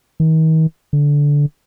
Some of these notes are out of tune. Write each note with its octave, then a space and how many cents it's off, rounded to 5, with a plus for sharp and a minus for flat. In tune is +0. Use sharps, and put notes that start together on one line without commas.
D#3 +40
D3 -15